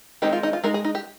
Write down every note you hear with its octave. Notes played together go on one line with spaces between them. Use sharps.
D#3 G#3 C4 D#4 G4
F4
D#4
F4
G#3 D#4 A#4
G#4
D#4
G4